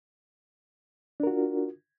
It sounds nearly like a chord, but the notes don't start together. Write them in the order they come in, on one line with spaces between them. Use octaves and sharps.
D4 A#4 F#4 F4